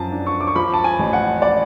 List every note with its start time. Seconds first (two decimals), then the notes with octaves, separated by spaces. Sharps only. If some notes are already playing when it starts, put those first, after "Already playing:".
Already playing: F#2 F3 A5
0.12 D4
0.27 C#6
0.41 D6
0.47 C#6
0.55 F3 B5
0.74 A5
0.84 G#5
0.99 A1
1.13 F#5
1.42 D5